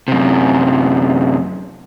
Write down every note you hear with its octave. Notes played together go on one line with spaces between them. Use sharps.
F#2 C3